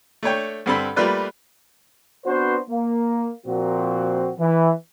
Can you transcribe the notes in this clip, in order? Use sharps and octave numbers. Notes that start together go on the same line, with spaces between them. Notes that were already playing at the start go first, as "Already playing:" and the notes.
A3 D4 C#5 G5
G2 D3 C4 D4 A4 B5
G3 A3 A#3 F4 B4 D5
B3 C4 D4 F#4 B4 C5
A#3
A#2 F3 C4 F#4
E3